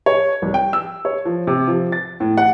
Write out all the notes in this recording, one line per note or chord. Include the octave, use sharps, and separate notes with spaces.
C#5
C2
G5
E6
C#5
F3
C3
F3
A6
A2
F#5